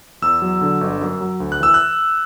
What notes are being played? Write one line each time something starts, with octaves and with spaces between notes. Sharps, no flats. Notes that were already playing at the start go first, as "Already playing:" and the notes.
E2 E6
F#3
D3
G1
F#2
F#3
D2
F#6
E3 E6
F#6